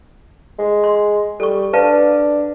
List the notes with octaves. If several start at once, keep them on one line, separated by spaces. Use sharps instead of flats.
G#3
C6
G3 A4 C#6
D4 B4 F5 A5